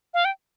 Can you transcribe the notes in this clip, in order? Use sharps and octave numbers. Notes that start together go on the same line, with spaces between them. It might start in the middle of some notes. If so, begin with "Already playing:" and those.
F5
G5